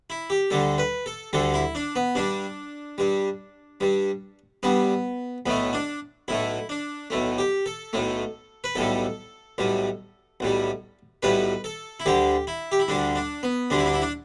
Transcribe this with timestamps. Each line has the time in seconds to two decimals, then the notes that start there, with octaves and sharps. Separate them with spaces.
0.10 E4
0.30 G4
0.50 D2 D3 G3 A4
0.78 B4
1.06 A4
1.33 D2 D3 G3 A4
1.54 E4
1.75 D4
1.96 B3
2.15 G2 G3 D4
2.98 G2 G3
3.80 G2 G3
4.63 G2 G3 B3
5.46 B1 A2 A3 B3
5.73 D4
6.28 B1 A2 A3 E4
6.69 D4
7.10 B1 A2 A3
7.38 G4
7.66 A4
7.93 B1 A2 A3
8.64 B4
8.75 B1 A2 G3 A4
9.58 B1 A2 G3
10.40 B1 A2 G3
11.23 B1 A2 G3 B4
11.64 A4
12.00 E4
12.06 D2 D3 G3 G4
12.47 E4
12.72 G4
12.79 E4
12.88 D2 D3 G3 D4
13.15 D4
13.43 B3
13.70 D2 D3 G3 D4
13.79 E4
13.86 D4
13.94 E4
14.02 D4